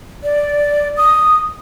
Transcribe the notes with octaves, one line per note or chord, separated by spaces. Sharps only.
D5
D#6